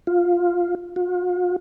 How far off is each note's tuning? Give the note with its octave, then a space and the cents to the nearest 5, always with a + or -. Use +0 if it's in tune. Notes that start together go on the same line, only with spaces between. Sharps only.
F4 +5
F4 +45